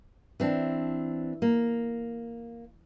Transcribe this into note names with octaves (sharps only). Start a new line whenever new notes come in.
E3 C4 D4
A#3